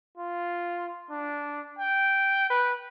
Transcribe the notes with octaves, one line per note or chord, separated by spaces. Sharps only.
F4
D4
G5
B4